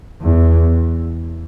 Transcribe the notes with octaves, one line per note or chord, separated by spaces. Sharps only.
E2